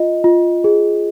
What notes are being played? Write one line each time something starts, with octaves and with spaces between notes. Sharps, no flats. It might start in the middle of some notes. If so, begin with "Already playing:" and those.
Already playing: F4 D#5
F4
G#4